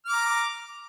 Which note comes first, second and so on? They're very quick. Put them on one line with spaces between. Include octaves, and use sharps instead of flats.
F6 D6 A#5